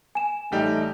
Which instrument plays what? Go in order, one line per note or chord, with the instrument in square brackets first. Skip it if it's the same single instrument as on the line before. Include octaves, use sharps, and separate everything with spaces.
[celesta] G#5 E7
[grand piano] A1 G3 G4 [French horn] A3 [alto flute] D#4